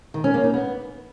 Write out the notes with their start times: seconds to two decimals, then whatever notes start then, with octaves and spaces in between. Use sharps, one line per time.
0.14 D#3
0.24 C#4
0.34 A#3
0.44 D#4
0.54 B3